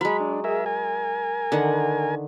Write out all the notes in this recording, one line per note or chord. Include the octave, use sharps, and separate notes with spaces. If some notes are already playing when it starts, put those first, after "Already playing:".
F#3 G#3 B5
D4
G#4 A#4 E5
A#4 G#5
D3 D#3 F#5